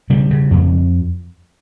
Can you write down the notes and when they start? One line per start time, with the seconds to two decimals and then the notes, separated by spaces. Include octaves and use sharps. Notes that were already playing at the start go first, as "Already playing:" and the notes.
0.10 C#3 G3
0.31 C#3
0.51 F2